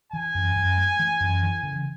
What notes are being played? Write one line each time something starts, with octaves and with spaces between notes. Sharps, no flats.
E3 G#5
F#2
F#2
A3
E3
F#2
E3
C#3